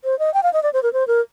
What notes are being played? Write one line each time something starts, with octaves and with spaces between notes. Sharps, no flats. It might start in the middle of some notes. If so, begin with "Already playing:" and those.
C5
D#5
G5
F5
D#5
D5
C5
A#4
C5
A#4